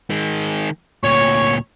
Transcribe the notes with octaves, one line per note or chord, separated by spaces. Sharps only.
D#3 G#3
D2 A#2 C#5